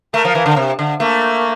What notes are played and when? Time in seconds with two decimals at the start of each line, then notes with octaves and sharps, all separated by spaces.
0.14 A3 A#4
0.25 F3
0.35 E3
0.46 D3
0.56 C3
0.79 D3
1.00 A3 A#3